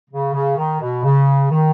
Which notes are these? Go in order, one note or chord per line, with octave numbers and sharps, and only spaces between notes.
C#3
C#3
D#3
B2
C#3
D#3